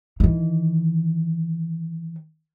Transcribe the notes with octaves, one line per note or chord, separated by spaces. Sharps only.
D#3 E3